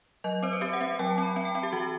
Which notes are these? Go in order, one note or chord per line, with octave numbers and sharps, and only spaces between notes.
F#3 D#5
C4 C5
B4
C4 G4
F#5
C4
F#3 G5
A5
C4 B5
C4 A5
G5
C4
G4
E3 F#4